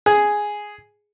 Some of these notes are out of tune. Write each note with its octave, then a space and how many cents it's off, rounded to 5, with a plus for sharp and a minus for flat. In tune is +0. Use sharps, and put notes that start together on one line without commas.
G#4 +0